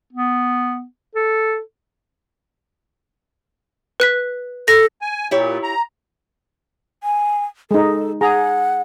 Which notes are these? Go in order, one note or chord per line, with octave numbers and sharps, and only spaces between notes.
B3
A4
B4 F#6 B6
A4 A#6
G#5
A#2 E4 G4 C#5
A#5
G#5
G#3 D#4 A4
G#4 F#5 A#5